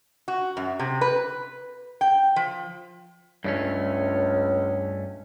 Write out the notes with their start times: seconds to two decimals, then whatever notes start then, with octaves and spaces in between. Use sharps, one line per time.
0.28 F#4
0.57 F#2
0.79 C3
1.01 B4
2.01 G5
2.36 F3
3.44 C#2 G2 A3 C#4